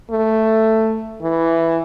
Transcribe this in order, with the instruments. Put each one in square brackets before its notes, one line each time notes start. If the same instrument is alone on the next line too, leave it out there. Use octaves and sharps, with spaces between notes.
[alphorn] A3
E3